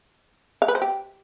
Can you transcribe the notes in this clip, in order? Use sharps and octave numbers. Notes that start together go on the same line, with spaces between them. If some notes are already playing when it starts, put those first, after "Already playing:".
F5
B4
C5
G4